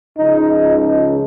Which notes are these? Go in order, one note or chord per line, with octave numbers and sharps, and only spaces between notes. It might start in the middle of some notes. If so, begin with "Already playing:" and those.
C#2 C#3 F3 D#4
D#4